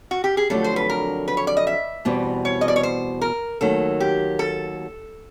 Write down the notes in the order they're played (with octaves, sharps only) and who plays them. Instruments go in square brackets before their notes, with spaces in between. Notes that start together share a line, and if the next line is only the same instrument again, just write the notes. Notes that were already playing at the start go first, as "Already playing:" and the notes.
[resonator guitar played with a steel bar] F#4
G4
G#4
[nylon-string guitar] F2 D3 F#3 A3 D4 [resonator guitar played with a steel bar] A4
[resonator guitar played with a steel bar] C5
B4
A#4
B4
C#5
D5
D#5
E5
[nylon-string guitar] E2 B2 G3 C4
[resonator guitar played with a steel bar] C#5
D#5
D5
C#5
C5
A#4
[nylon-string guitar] D#2 D#3 F#3 A3 [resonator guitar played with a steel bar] A4
[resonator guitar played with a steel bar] G4
A4